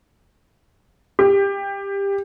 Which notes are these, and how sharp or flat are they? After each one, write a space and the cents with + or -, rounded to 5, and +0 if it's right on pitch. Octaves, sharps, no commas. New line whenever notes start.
G4 +20